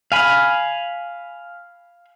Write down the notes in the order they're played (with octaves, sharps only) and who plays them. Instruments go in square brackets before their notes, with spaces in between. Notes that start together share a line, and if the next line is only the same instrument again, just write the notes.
[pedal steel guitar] F5 G#5 B5